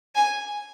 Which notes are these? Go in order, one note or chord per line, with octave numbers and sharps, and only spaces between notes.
G#5